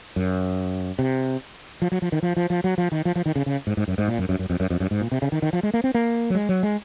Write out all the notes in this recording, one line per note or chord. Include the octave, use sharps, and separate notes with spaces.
F#2
C3
F3
F#3
F3
D#3
F3
F3
F3
F#3
F3
D#3
F3
F3
D#3
C#3
C#3
G#2
G#2
F#2
G#2
A#2
F#2
F#2
F#2
F2
F#2
F2
F#2
G#2
A#2
C3
C#3
D#3
D#3
F3
G#3
A#3
C4
A#3
F#3
G#3
F#3
G#3